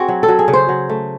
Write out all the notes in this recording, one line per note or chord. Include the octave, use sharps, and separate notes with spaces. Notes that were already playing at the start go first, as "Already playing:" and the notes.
Already playing: C4 F#4 G#4
F#3
A4
F#3
G#4
C#3
C5
F#3
A3